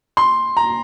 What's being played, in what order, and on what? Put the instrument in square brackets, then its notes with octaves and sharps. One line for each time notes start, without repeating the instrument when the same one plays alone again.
[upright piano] C6
A#5